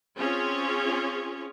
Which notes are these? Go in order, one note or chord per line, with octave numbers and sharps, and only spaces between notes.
C4 C#4 F4 G#4 C#5